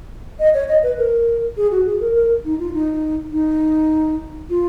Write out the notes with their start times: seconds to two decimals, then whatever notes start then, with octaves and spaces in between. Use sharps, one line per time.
0.39 D#5
0.54 C#5
0.68 D#5
0.83 B4
0.98 A#4
1.57 G#4
1.71 F#4
1.86 G#4
2.01 A#4
2.15 A#4
2.45 D#4
2.59 F4
2.74 D#4
3.32 D#4
4.50 F4